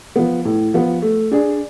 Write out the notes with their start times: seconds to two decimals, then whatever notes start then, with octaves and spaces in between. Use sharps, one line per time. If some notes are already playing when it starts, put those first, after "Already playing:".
0.16 F3 B3
0.45 A2
0.74 F3 B3
1.02 A3
1.31 D4 G#4